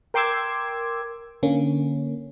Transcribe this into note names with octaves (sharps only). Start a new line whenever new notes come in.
A#4 G5 C6 D6 E6 G#6
D3 A#3 C#4